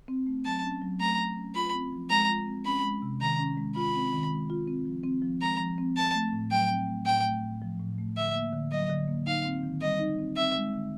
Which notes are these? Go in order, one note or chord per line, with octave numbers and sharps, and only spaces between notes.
C4
A3
F#3 A5
C#4
F#3
A3 A#5
F#3
C#4
F4 B5
C4
F3
G#3 A#5
F4
C4
C#4 B5
G#3
C3
D#3 A#5
C#4
G#3
F4 B5
C4
D#3
G#3
F4
C4
F3
C4
F3
G#3 A#5
F3
C4
C4 A5
A3
A2
F#3 G5
C4
A3
A2 G5
A3
A2
F3
A2
A3
D3 E5
A#3
D3
F#3 D#5
D3
A#3
D#4 F5
C4
D#3
G3 D#5
D#4
C4
C4 E5
G#3
D3